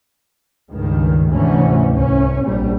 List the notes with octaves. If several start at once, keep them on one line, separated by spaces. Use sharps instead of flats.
C#2 G2 D#3
D2 G#2 C3 E3 C#4
C2 C#4
A#1 G3